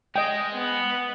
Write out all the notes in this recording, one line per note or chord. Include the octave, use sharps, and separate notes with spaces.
G#3 D#5 G5
B3 B4